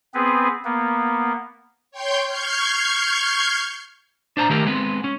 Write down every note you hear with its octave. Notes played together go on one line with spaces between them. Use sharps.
B3 C4 G#4 B4
A#3 B3
C#5 G5 C6 G6
C#6 F6 G6 G#6 C7
D4 C5 A5 A#5
D#3 A3 G4 A#4
G#3 B3 C4
C#4